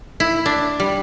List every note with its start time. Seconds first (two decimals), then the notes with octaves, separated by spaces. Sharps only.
0.20 E4
0.46 D4
0.80 G3